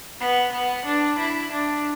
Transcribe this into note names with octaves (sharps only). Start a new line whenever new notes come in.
B3
B3
D4
E4
D4